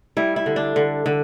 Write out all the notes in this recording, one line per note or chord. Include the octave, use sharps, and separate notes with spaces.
G3 E4
E4
D3
D4
D3
D3